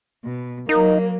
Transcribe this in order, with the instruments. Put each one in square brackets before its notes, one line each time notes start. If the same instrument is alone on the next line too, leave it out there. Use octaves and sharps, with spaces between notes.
[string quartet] B2
[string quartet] F#3 A#3 [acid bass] D#4 [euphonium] A#4